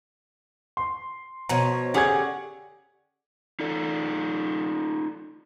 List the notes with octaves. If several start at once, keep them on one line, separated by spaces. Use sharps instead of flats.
C6
B2 F3 C#5 A#5
D3 C#4 G4 G#4 F#5 G#6
D#4 F4 A4 D5